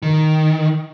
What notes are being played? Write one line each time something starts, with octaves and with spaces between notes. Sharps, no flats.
D#3